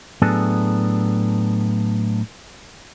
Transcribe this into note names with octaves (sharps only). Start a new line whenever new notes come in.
A2 F#3 B3 D4 G#4 A4